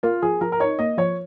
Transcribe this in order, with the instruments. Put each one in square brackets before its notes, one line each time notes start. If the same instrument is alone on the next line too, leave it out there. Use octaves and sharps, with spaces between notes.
[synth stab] A#3 [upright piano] F4
[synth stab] F3 [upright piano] G#4
[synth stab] F3 [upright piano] A#4
[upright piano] A#4
[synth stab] D#4 [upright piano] C#5
[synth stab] A#3 [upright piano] D#5
[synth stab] F3 [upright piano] C#5